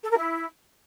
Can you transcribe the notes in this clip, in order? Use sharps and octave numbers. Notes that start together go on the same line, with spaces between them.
A4
A#4
E4